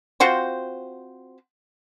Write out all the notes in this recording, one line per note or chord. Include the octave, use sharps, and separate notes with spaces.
C4 F4 F#4 C5